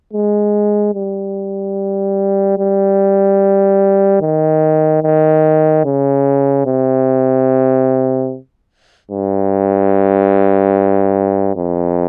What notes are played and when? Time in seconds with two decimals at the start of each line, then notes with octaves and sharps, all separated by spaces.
0.13 G#3
0.95 G3
2.58 G3
4.22 D#3
5.03 D#3
5.85 C#3
6.66 C3
9.11 G2
11.56 F2